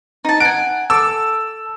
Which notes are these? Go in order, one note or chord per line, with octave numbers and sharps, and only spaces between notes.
D#4 A5
F#5 G#5 D7
A4 D6 E6